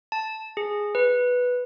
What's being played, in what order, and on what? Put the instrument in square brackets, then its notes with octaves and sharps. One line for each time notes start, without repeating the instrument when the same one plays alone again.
[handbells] A5
G#4
B4